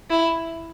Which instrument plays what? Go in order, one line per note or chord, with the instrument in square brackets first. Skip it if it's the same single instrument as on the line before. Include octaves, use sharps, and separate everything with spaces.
[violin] E4